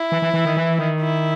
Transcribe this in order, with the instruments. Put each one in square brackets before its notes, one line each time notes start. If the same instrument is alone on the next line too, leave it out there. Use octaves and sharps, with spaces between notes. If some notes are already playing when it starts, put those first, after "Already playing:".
Already playing: [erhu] E4
[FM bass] E3
E3
E3
D#3
E3
D#3
[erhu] E4